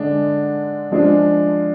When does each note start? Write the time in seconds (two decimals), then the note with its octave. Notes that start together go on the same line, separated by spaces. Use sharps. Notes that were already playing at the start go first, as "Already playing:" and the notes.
Already playing: D3 G#3 D4
0.91 F3 G#3 D4 F4